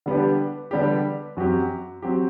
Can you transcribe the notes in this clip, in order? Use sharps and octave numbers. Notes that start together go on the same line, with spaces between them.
D3 G3 B3 D4 G4
D3 G3 B3 D4 G4
F#2 F#3 C4 G4
F#3 C4 G4